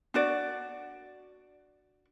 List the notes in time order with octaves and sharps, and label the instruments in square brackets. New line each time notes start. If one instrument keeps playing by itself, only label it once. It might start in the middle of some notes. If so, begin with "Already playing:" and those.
[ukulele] D4 F#4 D5